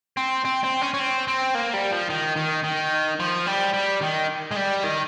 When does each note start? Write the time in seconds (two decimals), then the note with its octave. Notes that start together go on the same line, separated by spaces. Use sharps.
0.17 C4
0.45 C4
0.64 C4
0.81 C#4
0.94 C#4
1.00 C4
1.28 C4
1.55 A#3
1.73 G3
1.92 F3
2.10 D#3
2.36 D#3
2.64 D#3
3.20 F3
3.47 G3
3.74 G3
4.02 D#3
4.51 G#3
4.56 G3
4.84 D#3